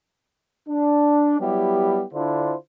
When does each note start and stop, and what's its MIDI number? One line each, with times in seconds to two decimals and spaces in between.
0.68 1.37 62
1.39 2.03 54
1.39 2.03 55
1.39 2.03 59
1.39 2.03 64
1.39 2.03 67
2.13 2.54 50
2.13 2.54 62
2.13 2.54 64
2.13 2.54 65
2.13 2.54 72